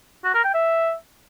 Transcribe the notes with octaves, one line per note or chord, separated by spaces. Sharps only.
F#4
A#4
G5
E5